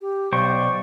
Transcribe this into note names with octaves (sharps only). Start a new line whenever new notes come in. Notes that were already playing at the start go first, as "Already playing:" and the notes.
G4
B1 C5 D5 G5 C#6